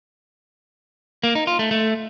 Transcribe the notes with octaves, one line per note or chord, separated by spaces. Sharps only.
A#3
D#4
F4
A3
A3